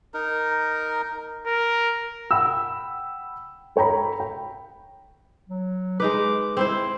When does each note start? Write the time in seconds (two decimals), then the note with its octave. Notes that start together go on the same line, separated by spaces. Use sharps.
0.14 D#4 A#4
1.47 A#4
2.31 F#5 G5 B5 E6
3.76 A4 C#5 G5 A#5 B5
4.20 G5
5.48 F#3
6.00 G#3 D#4 B4 D6
6.57 C4 E4 C5 C6